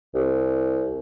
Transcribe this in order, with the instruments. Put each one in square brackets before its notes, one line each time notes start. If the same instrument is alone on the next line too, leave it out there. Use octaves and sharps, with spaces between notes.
[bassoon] C2